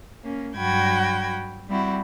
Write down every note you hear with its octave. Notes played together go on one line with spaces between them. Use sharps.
A#3 C#4
G2 F#3 F#4 G5 B5 G#6
G3 C4 E4 F#4